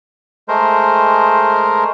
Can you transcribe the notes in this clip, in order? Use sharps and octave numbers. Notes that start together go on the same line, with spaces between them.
G#3 A3 A#4 C5